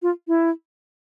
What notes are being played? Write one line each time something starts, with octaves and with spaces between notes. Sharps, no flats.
F4
E4